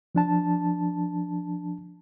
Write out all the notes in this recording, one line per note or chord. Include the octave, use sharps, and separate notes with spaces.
F3 D4 A5